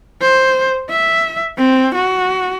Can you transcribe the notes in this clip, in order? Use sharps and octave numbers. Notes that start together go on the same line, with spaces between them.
C5
E5
C4
F#4